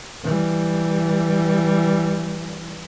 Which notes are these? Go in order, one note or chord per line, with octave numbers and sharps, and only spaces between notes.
E3 G3